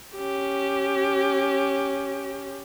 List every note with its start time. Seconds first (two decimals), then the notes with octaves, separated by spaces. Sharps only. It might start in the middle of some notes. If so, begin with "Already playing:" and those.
0.16 C#4 G4